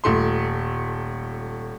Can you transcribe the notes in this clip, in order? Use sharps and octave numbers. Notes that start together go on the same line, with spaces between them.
D#1 A3 C6